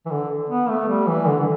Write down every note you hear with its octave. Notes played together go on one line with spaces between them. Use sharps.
E3
D3
B3
A3
G3
E3
D3
D3